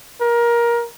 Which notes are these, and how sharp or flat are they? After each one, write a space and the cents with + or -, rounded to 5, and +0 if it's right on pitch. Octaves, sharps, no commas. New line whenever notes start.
A#4 +20